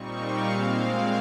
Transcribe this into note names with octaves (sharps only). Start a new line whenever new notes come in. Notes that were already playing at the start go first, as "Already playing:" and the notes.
Already playing: A#2 G3 C4 D#4 C#6
F5
A#2 G#3 C4 F5